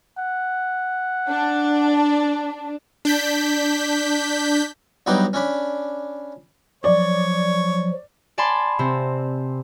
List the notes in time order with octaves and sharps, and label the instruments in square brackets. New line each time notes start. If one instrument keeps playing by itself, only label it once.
[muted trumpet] F#5
[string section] D4
[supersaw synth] D4 G6 B6
[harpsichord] G2 F#3 B3 D#4 D5 G5
C#4 D4 B5
[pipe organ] F3 F#3 [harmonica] C#5 [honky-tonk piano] D5
[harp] D5 G#5 A5 B5 C6
C3 C4